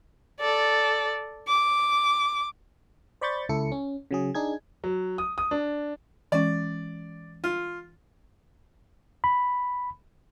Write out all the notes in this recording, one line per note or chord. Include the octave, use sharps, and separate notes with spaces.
A4 D5
D6
C5 D5 B5 C#6 G6 A6
C#2 E4 A4 C#7
C#4
C#3 F#3 G#4
D4 D#4 G#4 G#6
F#3
D#6
D#6
D4
E3 G#3 C#4 D5
F4
B5